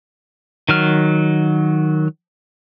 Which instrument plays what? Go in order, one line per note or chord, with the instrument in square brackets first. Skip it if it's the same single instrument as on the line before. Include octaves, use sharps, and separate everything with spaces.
[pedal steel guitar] D#3 F#3 F6